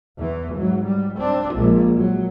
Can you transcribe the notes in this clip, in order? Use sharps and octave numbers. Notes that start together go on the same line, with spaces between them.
E2 E3
G#2 F#3
G3
C4 D4
A#1 G#3
F#3